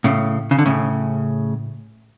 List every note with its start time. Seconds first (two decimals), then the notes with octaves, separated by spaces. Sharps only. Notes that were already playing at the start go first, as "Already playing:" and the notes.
0.04 A2 C#3
0.51 C#3
0.59 D3
0.66 A2 C#3